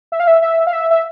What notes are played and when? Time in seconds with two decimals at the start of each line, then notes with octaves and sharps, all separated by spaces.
0.12 E5
0.20 F5
0.27 E5
0.42 E5
0.67 F5
0.73 E5
0.90 E5